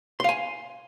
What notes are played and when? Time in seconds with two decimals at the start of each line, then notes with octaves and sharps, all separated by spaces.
0.20 C6
0.24 F5
0.29 G#5